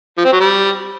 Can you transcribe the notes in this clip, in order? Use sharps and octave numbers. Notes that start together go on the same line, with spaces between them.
F3
C4
F#3
G3